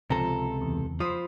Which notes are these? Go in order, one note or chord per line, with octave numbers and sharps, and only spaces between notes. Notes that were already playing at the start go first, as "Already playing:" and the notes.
C#2 C3 F3 A4 A#5
E2
F3 C5 B5 D#6